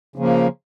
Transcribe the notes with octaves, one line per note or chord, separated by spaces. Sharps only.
C#3 F3 A#3